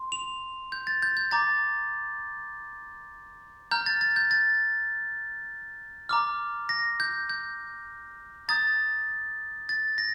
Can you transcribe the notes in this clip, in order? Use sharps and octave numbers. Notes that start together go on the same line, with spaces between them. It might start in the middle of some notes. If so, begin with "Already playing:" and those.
Already playing: C6
F7
G6
A6
G6
G6
A#5 D6 G6 A6
A#5 F6 G6
A6
A6
G6
A6
A#5 D6 F6
A#6
G6
G6
A#5 D#6 G6 A6
A6
A#6